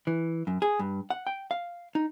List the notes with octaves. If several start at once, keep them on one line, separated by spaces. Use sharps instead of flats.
E3
F#2
G#4
G2
F#5
G5
F5
D#4